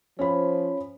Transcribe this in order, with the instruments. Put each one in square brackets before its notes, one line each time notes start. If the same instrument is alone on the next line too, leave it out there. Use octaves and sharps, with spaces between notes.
[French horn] F3 [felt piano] C#4 C5 B5